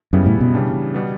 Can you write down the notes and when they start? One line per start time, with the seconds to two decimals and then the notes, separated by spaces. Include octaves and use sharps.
0.13 F#2 C#3 G3 B3 E4
0.26 A2
0.41 B2
0.54 C#3 E3 G3 D4
0.94 B2 G3 B3